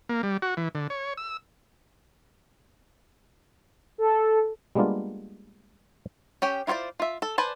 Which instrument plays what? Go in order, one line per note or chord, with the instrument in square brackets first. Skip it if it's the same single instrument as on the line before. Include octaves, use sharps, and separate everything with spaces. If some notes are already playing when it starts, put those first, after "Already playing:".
[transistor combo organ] A#3
G3
F#4
E3
D3
C#5
E6
[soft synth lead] A4
[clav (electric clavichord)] G3 G#3 A#3 B3 D4 F4
[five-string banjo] C#4 G4 G5
E4 F4 G#4 C5 D5
F4 E5
A4
B4 C5 D5 G#5 A5